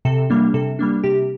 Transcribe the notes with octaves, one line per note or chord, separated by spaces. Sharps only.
C3 A4
G3 A#3 D4
C3 A4
G3 A#3 D4
C3 G4